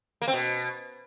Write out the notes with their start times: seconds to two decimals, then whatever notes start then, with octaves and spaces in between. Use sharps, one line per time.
0.22 A#3
0.28 C4
0.34 B2